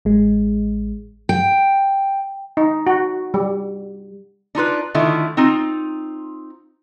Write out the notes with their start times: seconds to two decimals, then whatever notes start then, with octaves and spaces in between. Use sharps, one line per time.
0.05 A1 G#3
1.29 G5
2.57 D#4
2.87 F#4
3.34 G3
4.55 D4 D#4 F4 B4
4.94 D3 D#3 A3 E4 F4
5.37 C4 D#4 F4